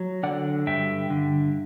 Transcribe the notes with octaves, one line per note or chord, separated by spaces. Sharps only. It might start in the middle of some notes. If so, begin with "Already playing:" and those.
Already playing: F#3
D3 D5 F#5
G2 E5 G5
D3